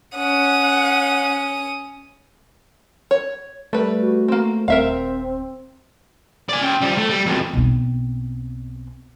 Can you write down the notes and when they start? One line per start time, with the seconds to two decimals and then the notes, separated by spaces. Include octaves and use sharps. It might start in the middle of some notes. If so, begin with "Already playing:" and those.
0.16 C#4 F#5 D#6
3.11 C#5
3.73 G3 A3 B4
4.01 F#4
4.28 A#3 C4
4.68 D#1 C4 A#4 E5 F5
6.49 D5 G#5
6.61 C#4 G5
6.81 F3 G3
6.97 A3
7.09 G3
7.26 F2 B2
7.54 B1 C4